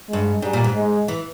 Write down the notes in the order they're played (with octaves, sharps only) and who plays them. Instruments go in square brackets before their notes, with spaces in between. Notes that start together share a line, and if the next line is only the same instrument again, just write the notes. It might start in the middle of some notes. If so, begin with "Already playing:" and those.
[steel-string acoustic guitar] G2 [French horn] G#3
[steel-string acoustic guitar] G#2 [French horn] G3
[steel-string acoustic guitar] A#2
G#2
[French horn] G#3
[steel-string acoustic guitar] E3